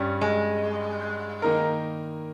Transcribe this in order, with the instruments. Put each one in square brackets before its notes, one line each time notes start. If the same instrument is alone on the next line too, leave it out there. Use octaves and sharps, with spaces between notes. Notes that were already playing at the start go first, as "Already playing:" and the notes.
Already playing: [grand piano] G2 G3 C#4
[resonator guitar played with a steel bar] G#3
[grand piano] D#3 A#3 D#4 A#4